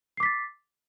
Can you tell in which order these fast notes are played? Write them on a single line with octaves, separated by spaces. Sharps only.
C7 D6 B6 A6